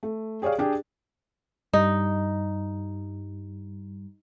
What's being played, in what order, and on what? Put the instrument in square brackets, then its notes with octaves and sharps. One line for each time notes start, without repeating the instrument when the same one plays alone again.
[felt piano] A3
G4 G#4 C#5 D5 F5
D4 G4 G#4
[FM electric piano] G2 G3 [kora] D#4